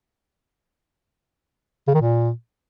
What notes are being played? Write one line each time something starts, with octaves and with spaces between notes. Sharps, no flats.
C#3
D#3
A#2